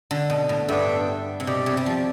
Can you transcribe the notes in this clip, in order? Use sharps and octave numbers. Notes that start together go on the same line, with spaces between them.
D3
B2
A2
G2 B3 D4 A4 E5 G5
C3
B2 G4 D5 G5
C3
G3
F3